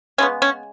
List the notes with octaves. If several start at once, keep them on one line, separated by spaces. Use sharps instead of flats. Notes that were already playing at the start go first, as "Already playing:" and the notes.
C#3 G#3 B3 C#4
C#4